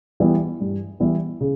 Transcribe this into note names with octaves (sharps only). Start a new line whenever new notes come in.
E3 G3 B3 E4
G2
E3 G3 B3 E4
C#3